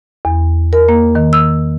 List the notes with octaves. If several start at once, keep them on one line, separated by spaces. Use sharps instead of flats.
E2
A#4
A#3
D#3
E6